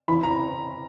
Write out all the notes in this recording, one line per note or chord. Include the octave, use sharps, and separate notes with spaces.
E3 B5
A#5